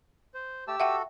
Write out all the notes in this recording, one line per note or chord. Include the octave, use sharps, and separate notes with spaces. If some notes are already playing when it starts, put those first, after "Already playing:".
C5
A3 G4 A5 E6
F#4 A4 E5 F#5 G5